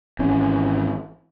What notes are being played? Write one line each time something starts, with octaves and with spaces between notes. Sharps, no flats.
G#1 E3 C#4